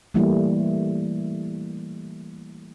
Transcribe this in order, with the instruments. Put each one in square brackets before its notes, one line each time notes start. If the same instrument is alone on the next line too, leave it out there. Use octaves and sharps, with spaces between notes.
[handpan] E3 G3 A3 A#3 E4